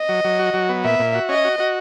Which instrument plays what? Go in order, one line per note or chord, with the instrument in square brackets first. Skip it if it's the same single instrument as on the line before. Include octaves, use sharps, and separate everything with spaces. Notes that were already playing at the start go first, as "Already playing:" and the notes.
Already playing: [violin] D#5
[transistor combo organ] F#3
F#3
F#4
F#3
B3
[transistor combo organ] A#2 [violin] E5
[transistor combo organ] A#2
F#4
[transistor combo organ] C#4 [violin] D#5
[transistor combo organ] F#4
F#4